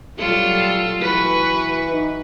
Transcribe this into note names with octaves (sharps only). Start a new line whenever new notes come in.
F#3 G3 F4 A4
E3 F#4 B4
D#4